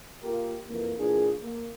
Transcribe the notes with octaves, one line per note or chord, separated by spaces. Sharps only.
A#3 F4 G4 A#4
F2 E3 A#3
A#2 E3 A#3 D4 G#4
A#3